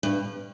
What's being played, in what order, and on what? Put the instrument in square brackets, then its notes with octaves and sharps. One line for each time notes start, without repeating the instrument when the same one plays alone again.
[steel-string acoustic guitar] G2